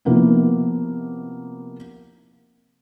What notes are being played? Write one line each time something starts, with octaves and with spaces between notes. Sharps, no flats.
C3 F3 A#3 B3 D#4 E4